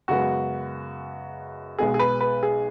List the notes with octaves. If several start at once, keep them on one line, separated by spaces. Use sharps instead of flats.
F#2 C#3 G#3 B3 F#4
B1 B2 G#3 B3 G#4
G#4
B4
B4
G#4